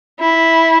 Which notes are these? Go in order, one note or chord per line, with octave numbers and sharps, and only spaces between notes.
E4